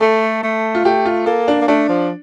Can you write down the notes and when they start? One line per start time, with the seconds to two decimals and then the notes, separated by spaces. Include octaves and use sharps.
0.01 A3 A4
0.43 A3
0.75 F4
0.85 A3 G4
1.06 F4
1.26 A#3 A4
1.48 D4
1.62 A#3
1.68 A3 D4
1.89 F3